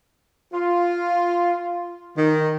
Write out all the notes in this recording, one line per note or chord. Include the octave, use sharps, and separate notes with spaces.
F4
D#3